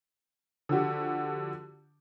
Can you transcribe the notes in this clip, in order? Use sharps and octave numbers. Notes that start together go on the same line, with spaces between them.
D3 F3 F#4 G4